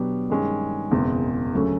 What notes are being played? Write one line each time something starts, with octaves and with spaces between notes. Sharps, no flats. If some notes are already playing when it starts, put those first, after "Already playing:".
Already playing: B2 F#3 B3 D4 G4
G2 D#3 G#3 C#4
F#1 E2 B2 G#3 C4
D2 C#3 F#3 A3 C#4